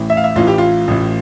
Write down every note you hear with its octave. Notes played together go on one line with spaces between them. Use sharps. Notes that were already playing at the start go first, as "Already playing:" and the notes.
Already playing: A1 A2 E3
E5
F5
E5
A1 A2 E3 F4
G4
F4
A1 A2 E3